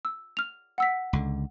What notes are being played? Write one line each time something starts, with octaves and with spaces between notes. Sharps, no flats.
E6
F6 F7
F#5 E6 B6
C#2 D3